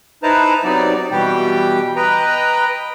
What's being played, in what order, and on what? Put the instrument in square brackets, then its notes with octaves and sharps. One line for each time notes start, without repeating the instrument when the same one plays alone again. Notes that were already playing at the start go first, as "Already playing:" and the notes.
[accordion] D#4 E4 B4 C5 A5 A#5
C3 F#3 B3 D#4 D5
B2 E3 G3 G4 G5
B4 D#5 G5 A#5